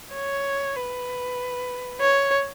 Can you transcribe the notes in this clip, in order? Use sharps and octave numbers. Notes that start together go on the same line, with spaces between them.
C#5
B4
C#5